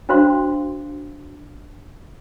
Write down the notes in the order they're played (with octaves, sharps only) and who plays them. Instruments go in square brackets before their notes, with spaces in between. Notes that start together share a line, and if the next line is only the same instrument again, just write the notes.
[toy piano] D4 F#4 C5 F5 C6